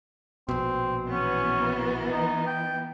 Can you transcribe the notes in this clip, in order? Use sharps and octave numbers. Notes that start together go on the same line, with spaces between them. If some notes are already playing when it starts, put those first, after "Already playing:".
A#1 B2 C4
E3 B3 C#4
D#4
G5